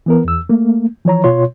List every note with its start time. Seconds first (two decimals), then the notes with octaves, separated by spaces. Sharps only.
0.06 E3 B3 A#4
0.25 E2 E6
0.49 A3 A#3
1.05 E3 F3 C#5 A#5
1.24 B2 F4 C#5 C6